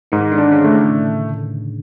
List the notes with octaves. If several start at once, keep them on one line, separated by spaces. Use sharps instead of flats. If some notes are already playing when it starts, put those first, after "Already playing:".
G#2 D#3
D3
D4
C#3
A3
A2